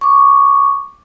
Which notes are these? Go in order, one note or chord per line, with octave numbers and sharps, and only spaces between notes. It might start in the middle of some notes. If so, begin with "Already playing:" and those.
C#6 D6